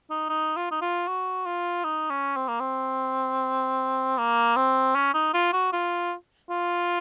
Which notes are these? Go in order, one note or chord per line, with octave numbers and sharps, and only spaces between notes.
D#4
D#4
F4
D#4
F4
F#4
F4
D#4
C#4
C4
A#3
C4
A#3
C4
C#4
D#4
F4
F#4
F4
F4